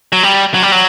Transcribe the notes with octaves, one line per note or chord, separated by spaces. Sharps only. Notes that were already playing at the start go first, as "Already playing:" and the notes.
F#3
G3
F#3
G3
F#3